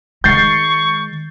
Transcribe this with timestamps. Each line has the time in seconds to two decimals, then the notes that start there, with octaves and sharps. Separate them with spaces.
0.24 D#3 G#3 C#6 G6 A6 C7